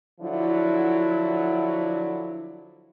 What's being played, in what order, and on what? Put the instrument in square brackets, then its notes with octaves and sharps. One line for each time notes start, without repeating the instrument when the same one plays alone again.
[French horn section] D3 F3 F#3 E4